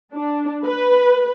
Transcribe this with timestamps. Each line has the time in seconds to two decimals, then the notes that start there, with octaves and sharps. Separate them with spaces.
0.14 D4
0.64 B4